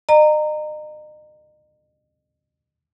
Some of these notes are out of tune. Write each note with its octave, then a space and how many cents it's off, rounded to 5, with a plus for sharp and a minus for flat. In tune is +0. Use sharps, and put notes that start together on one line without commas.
D#5 -40 A#5 -15